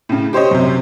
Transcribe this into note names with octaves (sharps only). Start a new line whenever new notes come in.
A2 C#3
G4 C5 C#5 D#5
F#2 C3